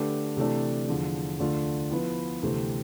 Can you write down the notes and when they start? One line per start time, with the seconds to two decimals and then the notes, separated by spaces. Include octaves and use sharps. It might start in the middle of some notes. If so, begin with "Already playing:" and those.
Already playing: D3 A3 D4 G4 B4
0.36 C3 E3 A3 D4
0.88 E2 D3 F3
1.39 D2 D3 A3 D4 F4
1.91 F3 B3 E4 B4
2.42 D2 C3 E3 A3 C4